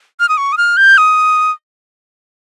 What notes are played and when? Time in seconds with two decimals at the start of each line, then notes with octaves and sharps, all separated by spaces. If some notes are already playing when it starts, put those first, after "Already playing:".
0.20 F6
0.29 D#6
0.38 C#6
0.52 D#6
0.58 F6
0.77 G6
0.98 D#6